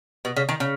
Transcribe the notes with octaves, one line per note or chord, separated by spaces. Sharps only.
B2
C#3
D#3
C#3